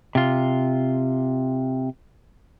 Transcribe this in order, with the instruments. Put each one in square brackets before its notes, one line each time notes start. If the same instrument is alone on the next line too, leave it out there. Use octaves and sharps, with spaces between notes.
[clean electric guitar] C3 F4